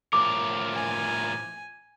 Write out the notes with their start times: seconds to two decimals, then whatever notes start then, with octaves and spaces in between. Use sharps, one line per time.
0.13 A2 F3 A#4 D6
0.73 G#5